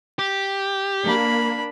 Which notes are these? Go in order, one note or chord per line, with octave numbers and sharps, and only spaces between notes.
G4
A#3 D4 B5